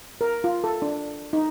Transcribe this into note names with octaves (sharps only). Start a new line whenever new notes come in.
A#4
F4
A4
D4
D#4